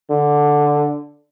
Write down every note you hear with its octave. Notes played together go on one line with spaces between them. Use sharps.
D3